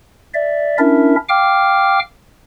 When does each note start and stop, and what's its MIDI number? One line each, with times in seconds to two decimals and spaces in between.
0.34 0.78 74
0.34 0.78 76
0.79 1.16 61
0.79 1.16 62
0.79 1.16 64
0.79 1.16 70
0.79 1.16 76
1.29 1.99 77
1.29 1.99 79
1.29 1.99 86
1.29 1.99 89